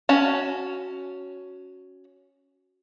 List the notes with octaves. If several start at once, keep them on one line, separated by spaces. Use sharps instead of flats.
C#4 F#4 A5